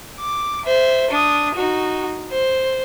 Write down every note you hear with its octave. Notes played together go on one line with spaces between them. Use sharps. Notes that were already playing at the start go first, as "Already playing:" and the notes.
D6
C5 E5
D4 D#6
D#4 F#4
C5